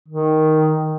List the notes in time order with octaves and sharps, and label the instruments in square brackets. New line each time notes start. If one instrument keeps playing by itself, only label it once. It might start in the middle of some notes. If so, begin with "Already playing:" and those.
[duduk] D#3